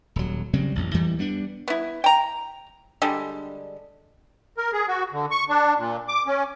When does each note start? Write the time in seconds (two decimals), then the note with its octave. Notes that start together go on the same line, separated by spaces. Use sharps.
0.16 D#1 F#3
0.53 C#3 F#3 G3 C4
0.75 A1 F2
0.94 F2 E3 G3
1.19 G3 B3 D4
1.68 B3 E4
2.04 G5 A#5
3.02 D3 G3 G#3
4.57 A#4
4.73 G#4
4.88 F#4
5.12 D3
5.31 C#6
5.49 D4
5.78 A#2
6.08 D6
6.27 C#4